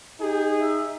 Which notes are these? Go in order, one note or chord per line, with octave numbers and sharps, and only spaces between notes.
D#4 G4 G#4
E5